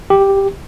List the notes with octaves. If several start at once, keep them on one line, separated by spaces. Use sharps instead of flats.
G4